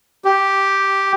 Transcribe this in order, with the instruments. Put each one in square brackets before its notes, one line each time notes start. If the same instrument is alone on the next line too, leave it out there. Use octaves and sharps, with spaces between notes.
[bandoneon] G4